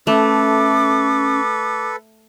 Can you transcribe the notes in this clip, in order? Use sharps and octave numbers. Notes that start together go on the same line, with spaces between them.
A3 C#4 A4 B4 D6